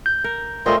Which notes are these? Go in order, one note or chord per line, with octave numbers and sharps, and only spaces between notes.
G6
A#4
A#2 A3 C4 C#4 D#5 C6